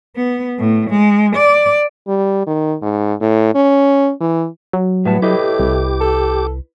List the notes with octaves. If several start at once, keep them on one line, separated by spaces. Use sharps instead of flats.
B3
A2
G#3
D5
G3
D#3
G#2
A2
C#4
E3
F#3
A2 G3 B3 E5 A5
A2 E4 G4 B4 D#5 D6
C2
A4